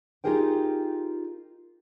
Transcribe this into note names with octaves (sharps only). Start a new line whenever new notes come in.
D#4 F4 G4 G#4 A#4 G5